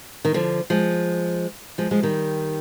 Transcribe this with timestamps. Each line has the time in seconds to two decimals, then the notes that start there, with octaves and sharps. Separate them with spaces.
0.25 D#3
0.34 D3 F3
0.70 F3 G#3
1.78 F3 G#3
1.91 F3 G#3
2.03 D#3 G3